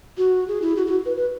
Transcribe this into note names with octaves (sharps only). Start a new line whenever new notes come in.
F#4
G#4
E4
F#4
F#4
B4
B4